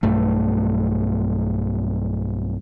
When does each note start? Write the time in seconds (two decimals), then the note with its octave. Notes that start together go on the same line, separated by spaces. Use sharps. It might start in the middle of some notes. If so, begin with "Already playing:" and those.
0.03 B1 G2 A3